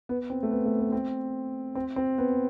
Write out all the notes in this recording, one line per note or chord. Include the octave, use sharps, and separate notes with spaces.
B3
C4
A3
B3
A3
B3
C4
C4
C4
B3